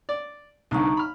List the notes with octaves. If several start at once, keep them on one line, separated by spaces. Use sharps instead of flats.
D5
C2 D3 D#4 A#5 C#6
B5 F6